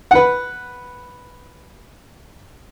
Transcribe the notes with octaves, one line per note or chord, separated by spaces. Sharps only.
B4 F#5